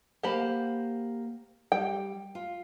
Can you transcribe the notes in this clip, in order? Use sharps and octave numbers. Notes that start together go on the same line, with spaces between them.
A#3 G4 C5 F#5 B5
G3 G5
F4